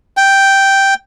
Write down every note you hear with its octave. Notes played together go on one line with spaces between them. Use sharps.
G5